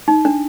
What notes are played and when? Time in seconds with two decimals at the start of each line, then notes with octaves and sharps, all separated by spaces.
0.08 D#4
0.25 D4